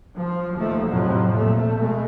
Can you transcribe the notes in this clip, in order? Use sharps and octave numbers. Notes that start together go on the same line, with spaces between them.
F3
D#2 F3 A3
F2 A2 C3 F3 F#3
A#2 A3
B2 G#3 A3